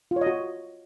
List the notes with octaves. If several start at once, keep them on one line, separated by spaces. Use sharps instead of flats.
F4
C#5
D#5
F#4